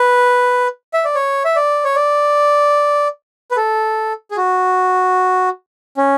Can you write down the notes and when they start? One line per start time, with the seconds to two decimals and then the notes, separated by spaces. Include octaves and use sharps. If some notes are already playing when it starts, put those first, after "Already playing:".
Already playing: B4
0.94 E5
1.05 D5
1.15 C#5
1.45 E5
1.56 D5
1.84 C#5
1.96 D5
3.51 B4
3.57 A4
4.31 G#4
4.37 F#4
5.97 C#4